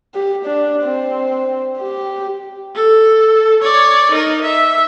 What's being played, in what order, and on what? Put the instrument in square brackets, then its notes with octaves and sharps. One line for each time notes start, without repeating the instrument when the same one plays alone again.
[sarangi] G4
D4
C4
G4
[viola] A4
C#5 D5
D#4 A#4
E5